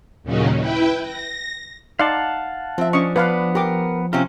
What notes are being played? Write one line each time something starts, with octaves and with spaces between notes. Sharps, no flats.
D#2 A#2 C#3 F#3 C#4 D#4
E4 B4 G5
A#6
D#4 D5 F5 F#5 A5 C6
F3 C4 E5
C#4 D4 D#5 C#6
B3 D4 B4 F5 B5
G4 A#4 D6
C3 C4 C#4 F4